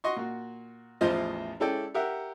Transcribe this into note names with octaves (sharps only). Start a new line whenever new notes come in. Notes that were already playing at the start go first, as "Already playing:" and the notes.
F#4 D#5 C6 C#6
A#2 F#4
A1 E2 F3 F4 C5 D#5
G#3 C#4 E4 A4 D5 G5
G4 A#4 E5 F#5